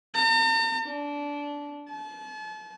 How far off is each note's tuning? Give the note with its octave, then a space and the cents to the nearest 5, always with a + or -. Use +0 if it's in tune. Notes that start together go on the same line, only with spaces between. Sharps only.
A#5 -45
D4 -20
A5 -35